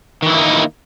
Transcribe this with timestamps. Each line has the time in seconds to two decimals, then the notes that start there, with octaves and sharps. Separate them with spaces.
0.22 D#3
0.26 E3
0.30 E4
0.34 A#3
0.37 D#4